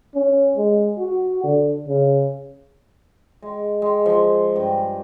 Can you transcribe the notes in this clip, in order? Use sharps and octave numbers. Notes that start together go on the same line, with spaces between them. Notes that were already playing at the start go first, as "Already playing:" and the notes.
C#4
G#3
F#4
D3
C#3
G#3
G#3
F3
G2